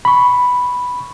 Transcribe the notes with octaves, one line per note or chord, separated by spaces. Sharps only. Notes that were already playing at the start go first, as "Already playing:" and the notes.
B5 C#6